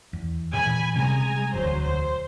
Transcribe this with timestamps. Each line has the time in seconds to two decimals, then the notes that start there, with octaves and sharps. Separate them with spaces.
0.13 E2
0.53 A#2 E3 G#5 B5
0.96 C3 G3 G#3 C#4 G#5 A#5
1.54 E1 D2 F#3 C5
1.84 C5